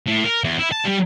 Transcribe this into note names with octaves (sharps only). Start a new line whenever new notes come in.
A2
A#4
E2
E4
A5
G3